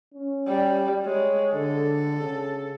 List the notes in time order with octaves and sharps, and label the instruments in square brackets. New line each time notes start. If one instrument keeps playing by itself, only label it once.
[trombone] C#4
[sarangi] G3
[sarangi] G#3 [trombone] C#5
[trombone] D3 [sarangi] A4
[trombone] C#3